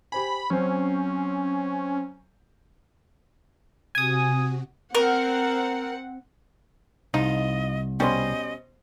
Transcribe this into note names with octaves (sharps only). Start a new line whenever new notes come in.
G4 C5 G#5 B5
F#3 C4 C#4 C5
C3 F#4 G#5 D#6
C4 A#4 F#5
C2 F3 D#4 F4 D#5
B2 G3 C#4 C5 D#5 C6